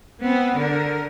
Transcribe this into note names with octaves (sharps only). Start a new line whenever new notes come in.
B3 C4
D3 A#4